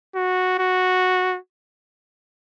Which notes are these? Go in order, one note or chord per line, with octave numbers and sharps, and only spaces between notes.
F#4
F#4